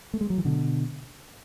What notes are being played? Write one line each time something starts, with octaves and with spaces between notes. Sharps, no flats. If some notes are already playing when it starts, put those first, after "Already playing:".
A3
G#3
F#3
E3
B2 D3